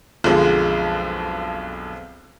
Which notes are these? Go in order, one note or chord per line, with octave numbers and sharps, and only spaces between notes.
B1 F2 D3 F3 G#3